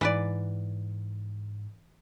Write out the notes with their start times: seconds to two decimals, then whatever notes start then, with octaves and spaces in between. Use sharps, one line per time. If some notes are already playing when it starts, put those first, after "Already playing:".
0.01 G#2 E3 B4 D5